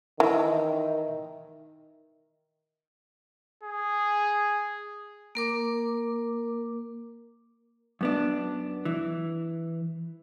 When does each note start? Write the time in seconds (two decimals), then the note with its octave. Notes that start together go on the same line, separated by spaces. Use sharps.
0.20 D#3 E3 E5
3.63 G#4
5.35 A#3 A#4 D6
8.01 F#2 B3 D4
8.85 E3